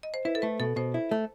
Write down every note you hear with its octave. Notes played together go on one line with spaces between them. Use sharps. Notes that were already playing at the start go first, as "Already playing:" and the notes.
D#5
C5
E4 B4
A4
A3 B4
B2 A4
B2 C5
E4
A3